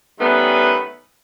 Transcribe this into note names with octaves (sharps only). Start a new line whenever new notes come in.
D#3 G3 A3 B3 C#4 B4